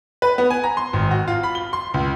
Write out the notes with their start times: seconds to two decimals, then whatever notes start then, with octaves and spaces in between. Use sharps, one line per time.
0.22 B4
0.38 B3
0.50 G#5
0.64 A#5
0.77 C6
0.93 G#1
1.11 F#4
1.28 F4
1.43 B5
1.55 G7
1.73 C6
1.94 C#2